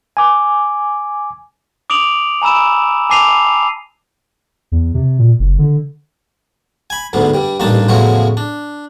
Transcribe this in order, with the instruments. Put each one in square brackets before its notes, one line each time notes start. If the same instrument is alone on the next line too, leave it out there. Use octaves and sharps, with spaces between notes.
[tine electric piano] G#5 D6
[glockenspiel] D6 D#6 D7 F7 F#7
G#5 A#5 B5 E6 E7
G#5 A5 D6 C7 D#7 F7
[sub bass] E2
C3
A#2
F#1
D3
[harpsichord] G#5 B5
D2 G#2 D3 B3
G2 G3
A1 G2 A#2 D4 D#4 A5
E2 A2 C#3 F3 G#3 F#4
D4